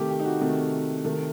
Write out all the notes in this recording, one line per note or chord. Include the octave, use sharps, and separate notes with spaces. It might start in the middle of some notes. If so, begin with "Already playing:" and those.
Already playing: C3 D#3 A3 G4
G4
D#4
F#4
C3 D#3 A3
C3 D#3 A3